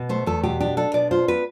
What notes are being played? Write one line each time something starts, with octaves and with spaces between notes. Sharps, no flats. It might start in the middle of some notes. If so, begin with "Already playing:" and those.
Already playing: B2
A3 C5
E2 A4
B2 G4
D4 G4
D4 A4
B2 D5
F4 C5
B3 B4